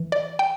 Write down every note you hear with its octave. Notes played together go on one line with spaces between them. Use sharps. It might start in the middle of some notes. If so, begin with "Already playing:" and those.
Already playing: E3
D5
G5